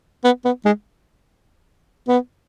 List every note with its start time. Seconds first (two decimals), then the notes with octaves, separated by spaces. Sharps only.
0.24 B3
0.45 B3
0.65 G#3
2.08 B3